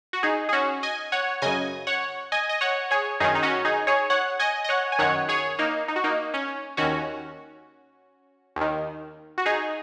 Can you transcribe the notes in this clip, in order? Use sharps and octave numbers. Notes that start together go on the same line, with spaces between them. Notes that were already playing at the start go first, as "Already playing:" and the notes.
F#4
D#4 G#4
G#4
C#4 F#4
D#5 G#5
C#5 F#5
F#2 C#3 D#5 G#5
C#5 F#5
D#5 G#5
D#5
C#5 F#5
G#4 C#5
F#2 D#3 D#4 G#4
D#4
C#4 F#4
D#4 G#4
G#4 C#5
C#5 F#5
D#5 G#5
D#5
C#5 F#5
G#5
F#2 D#3 C#5 F#5
G#4 C#5
A#3 D#4
D#4
F#4
A#3 D#4
C#4
D#2 D#3 C#4 F#4
D#2 D#3
F#4
D#4 G#4